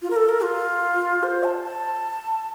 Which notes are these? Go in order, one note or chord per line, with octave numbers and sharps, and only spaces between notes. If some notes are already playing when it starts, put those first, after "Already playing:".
F4
A#4
A4
A#4
F4
C5
A5
A5